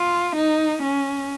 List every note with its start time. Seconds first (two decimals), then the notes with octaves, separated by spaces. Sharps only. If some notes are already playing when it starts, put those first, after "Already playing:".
Already playing: F4
0.36 D#4
0.83 C#4